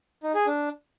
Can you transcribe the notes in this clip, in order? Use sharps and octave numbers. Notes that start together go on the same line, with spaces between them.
D#4
G#4
D4